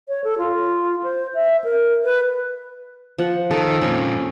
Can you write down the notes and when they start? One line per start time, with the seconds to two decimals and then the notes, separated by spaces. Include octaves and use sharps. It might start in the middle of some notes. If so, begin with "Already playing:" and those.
0.08 C#5
0.24 A4
0.38 F4
1.03 C5
1.35 E5
1.64 A#4
2.04 B4
3.18 F3 F#5
3.51 D#3 A4
3.81 F2 A#2 C#4